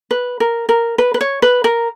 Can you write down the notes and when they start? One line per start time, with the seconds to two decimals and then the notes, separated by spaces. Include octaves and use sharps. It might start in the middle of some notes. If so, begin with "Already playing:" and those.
0.11 B4
0.40 A#4
0.69 A#4
0.98 B4
1.14 B4
1.21 C#5
1.42 B4
1.64 A#4